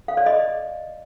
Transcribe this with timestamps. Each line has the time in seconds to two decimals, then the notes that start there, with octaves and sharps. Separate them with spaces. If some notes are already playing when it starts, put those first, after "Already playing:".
0.08 F5
0.17 D5
0.26 D#5